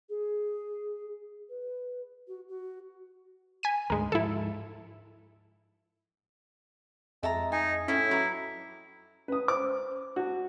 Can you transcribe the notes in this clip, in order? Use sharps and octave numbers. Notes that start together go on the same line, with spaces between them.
G#4
B4
F#4
F#4
G#5 B6 D#7
D2 G#2 G#3 A#4
G#2 F3 E4 A4
F2 G#3 E5 A5 A#5
D#4 G#5
A2 C#4 E4
F#3 B4 A#5 D6
C#4 B4 D#6
C5 D6
D4 E4 F#4